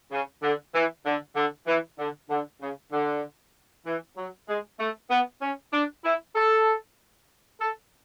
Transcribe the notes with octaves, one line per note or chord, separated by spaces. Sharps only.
C#3
D3
E3
D3
D3
E3
D3
D3
C#3
D3
E3
F#3
G#3
A3
B3
C#4
D4
E4
A4
A4